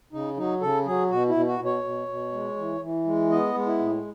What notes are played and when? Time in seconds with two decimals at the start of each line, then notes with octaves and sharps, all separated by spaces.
0.13 C#3 D#4
0.37 F#3 D#4
0.61 C#3 A4
0.86 F#3 G#4
1.10 B2 F#4
1.29 E4
1.35 B2
1.47 F#4
1.59 B2
1.65 C#5
1.83 B2
2.08 B2
2.32 G#3
2.57 E3
2.81 E3
3.05 G#3
3.30 B3 D#5
3.54 G#3
3.66 E4
3.79 A2